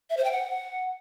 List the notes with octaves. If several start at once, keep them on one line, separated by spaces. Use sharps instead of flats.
E5
C5
G5
F#5